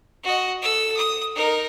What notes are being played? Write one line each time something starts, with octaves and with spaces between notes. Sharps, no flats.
F#4 D#5
A4 E6
D#6
D#4 A#4